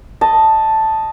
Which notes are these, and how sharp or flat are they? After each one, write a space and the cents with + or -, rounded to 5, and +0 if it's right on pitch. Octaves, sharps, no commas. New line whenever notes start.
D#5 +0 A5 +0